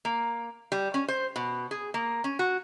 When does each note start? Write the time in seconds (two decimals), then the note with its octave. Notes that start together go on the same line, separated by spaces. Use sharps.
0.05 A#3
0.72 G3
0.94 C#4
1.08 C5
1.36 B2
1.71 G#4
1.94 A#3
2.24 C#4
2.39 F#4